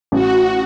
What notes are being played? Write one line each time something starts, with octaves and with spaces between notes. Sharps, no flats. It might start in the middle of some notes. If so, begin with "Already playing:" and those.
A1 F#4